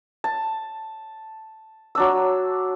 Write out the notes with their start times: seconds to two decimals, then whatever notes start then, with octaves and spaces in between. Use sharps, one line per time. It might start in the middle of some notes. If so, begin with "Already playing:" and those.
0.24 A5
1.95 F#3 D4 E6